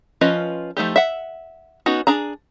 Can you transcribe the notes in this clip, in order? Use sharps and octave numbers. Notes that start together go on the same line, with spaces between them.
F3 C#4 F4 B4 D#5
F3 A3 D#4 G4
E5 F#5
B3 C#4 D#4 F#4
D4 G#4 A#5